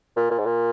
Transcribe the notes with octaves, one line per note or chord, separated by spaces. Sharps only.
A#2
A#2
G#2
A#2